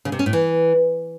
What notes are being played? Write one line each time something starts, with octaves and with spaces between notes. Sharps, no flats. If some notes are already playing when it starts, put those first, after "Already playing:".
C#3
C3
C#4
A2
E3